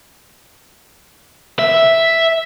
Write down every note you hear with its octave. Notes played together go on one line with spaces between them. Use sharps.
E5